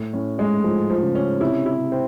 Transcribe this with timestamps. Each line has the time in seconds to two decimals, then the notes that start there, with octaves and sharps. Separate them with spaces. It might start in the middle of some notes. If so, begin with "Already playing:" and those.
Already playing: A2
0.13 A2 C#4
0.38 G#2 G#3
0.58 A2
0.64 G#2 F3
0.90 F3
1.03 C#3
1.15 C#4
1.40 C3 E4
1.66 E4
1.79 C3
1.92 C4